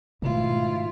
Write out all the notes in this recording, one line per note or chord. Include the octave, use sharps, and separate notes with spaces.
G#2 B2 D#3 A3 E4 F4